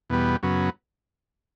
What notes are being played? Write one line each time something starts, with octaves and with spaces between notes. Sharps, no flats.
E2 B2 G3 B3
F#2 C#3 F#3 B3